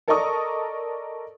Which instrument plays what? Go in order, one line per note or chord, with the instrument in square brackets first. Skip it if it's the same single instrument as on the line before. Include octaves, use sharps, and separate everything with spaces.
[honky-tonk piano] A4 A#4 D5 D#5 C#6 D#6